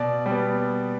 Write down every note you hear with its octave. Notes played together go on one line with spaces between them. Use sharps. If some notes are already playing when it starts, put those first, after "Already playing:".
Already playing: B2 D5
G3
B3